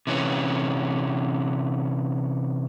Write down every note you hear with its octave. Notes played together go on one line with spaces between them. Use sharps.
C3 E3 C#4